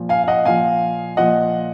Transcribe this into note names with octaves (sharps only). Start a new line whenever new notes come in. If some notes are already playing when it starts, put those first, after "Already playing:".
Already playing: A#2 F3
F5 G#5
F5
D#5 F#5
A#2 F3 F5 G#5
A#2 F3 D#5 F#5